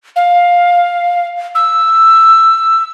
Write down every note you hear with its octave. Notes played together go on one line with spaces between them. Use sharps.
F5
E6